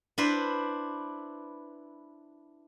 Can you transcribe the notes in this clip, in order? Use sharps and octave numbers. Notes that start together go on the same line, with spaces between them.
D4 E4 B4 C5